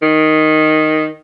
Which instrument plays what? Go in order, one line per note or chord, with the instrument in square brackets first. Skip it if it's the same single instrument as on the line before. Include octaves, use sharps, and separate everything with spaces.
[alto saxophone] D#3